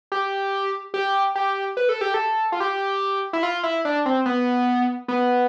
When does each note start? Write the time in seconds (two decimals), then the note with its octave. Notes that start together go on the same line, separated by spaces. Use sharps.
0.12 G4
0.94 G4
1.35 G4
1.77 B4
1.89 A4
2.01 G4
2.14 A4
2.52 F4
2.60 G4
3.33 E4
3.43 F4
3.63 E4
3.85 D4
4.06 C4
4.26 B3
5.08 B3